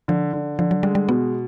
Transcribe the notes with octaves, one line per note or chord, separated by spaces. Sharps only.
D3 F3
D3
D3 F3
F#3
G3 G#3
G3
B2 B3